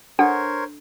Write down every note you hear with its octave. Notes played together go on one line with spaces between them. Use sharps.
D4 A4 A#4 C5 C#5 F#5